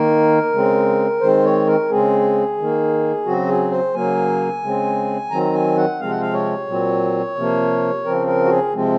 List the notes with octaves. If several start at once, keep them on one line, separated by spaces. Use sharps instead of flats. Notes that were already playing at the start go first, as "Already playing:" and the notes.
Already playing: D#3 A#3 A#4
C#3 G#3 C4
D#3 G#3 C4 C5
C#5
A#4
C#3 G#3 C4 G#4
D#3
A#3
C#3 F#3 C4 F#4
G#4
C5
C#3 F#3 A#3 G#5
C#3 G#3 C4
D#3 F#3 C4 A#5
G#5
F#5
C3 F3 G#3 C4 F5
F#5
F5
C#5
A#2 F#3 C4
C3 F3 A#3
C#3 F3 C4 A#4
A#4
F#4
G#4
C3 F3 G#3 C4